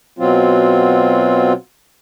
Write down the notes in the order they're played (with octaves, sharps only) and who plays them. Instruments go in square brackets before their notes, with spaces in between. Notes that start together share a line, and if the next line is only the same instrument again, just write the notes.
[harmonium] B2 F#3 C4 F4